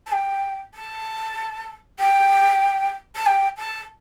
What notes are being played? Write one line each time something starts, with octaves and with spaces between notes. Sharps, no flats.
A5
G5
A5
G5
A5
G5
A5